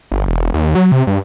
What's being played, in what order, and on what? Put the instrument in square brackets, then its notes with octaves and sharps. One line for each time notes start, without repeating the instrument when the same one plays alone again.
[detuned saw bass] G1
E1
D#2
F#3
C3
G2